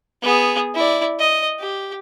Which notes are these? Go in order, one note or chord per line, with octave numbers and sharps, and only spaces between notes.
B3 G#4
E4 D5
D#5
G4